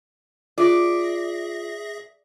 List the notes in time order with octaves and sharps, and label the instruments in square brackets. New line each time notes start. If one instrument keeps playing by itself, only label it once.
[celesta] F4 [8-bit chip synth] G#4 E5 A#6 [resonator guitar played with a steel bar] D5